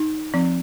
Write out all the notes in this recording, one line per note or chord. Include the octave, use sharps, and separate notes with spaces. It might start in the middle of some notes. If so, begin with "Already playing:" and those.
Already playing: D#4
F3 C4